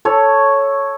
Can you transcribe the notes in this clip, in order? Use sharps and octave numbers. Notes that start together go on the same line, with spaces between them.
A4 C#5